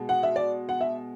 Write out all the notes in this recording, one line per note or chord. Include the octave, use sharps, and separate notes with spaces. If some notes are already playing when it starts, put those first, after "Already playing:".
Already playing: B2 G#3
F#5
E5
D5
F#5
E5